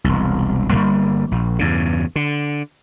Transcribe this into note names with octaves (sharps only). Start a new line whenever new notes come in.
E1 C2
G1 F#2 G3 A#3
A#1
E2 G2 C#3
D3